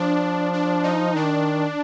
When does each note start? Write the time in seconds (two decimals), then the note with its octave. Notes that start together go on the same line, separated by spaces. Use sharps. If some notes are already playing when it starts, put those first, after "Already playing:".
Already playing: F3 D4
0.53 D4
0.83 D#4
1.15 D#3 D4